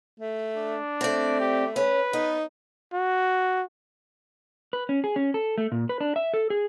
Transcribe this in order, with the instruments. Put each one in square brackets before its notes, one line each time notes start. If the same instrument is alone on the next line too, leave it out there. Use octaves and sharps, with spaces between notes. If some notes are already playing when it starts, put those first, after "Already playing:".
[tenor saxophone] A3
[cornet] D4
[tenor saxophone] A3 [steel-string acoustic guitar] C4 D5
[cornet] G4
[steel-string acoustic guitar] C#4 [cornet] B4
[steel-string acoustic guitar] B3 [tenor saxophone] D#4
[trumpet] F#4
[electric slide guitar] B4
C#4
G#4
C#4
A4
A3
A#2
B4
D4
E5
A4
G#4